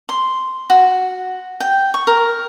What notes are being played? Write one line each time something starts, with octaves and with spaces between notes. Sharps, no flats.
C6
F#4
G5
C#6
A#4